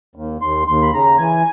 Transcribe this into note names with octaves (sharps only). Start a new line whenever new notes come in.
D#2
D#2 C6
D#2 C6
B5
C#3 A#5
E3 G#5